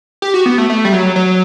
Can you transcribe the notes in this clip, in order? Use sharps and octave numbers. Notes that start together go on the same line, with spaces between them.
G4
F#4
B3
A3
A3
G3
F#3
F#3